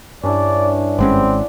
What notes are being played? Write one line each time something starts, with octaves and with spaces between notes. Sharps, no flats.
G2 C#4 D4 E4 D5
G#1 G#3 C4 C#4 D5 F#5 B5